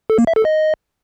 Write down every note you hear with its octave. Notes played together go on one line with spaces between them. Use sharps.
A4
A#3
E5
A4
D#5